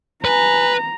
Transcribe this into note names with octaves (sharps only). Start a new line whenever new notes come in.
B4 G#5 A#5